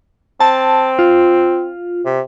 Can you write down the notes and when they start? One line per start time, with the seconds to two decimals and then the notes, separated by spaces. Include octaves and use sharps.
0.40 C4 A5
0.99 F4
2.05 C3